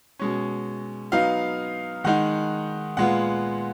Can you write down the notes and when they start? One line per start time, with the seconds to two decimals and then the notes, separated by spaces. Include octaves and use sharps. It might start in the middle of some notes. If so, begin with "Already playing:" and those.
0.19 B2 G#3 C#4
1.12 F#3 B3 D#4 F5
2.04 D#3 G#3 D#4 F#5
2.97 A#2 G#3 B3 F4 F#5